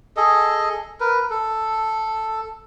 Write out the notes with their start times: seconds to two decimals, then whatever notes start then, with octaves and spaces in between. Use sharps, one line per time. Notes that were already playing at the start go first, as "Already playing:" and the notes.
0.17 G#4 A4 D#5
1.00 A#4 B4
1.30 A4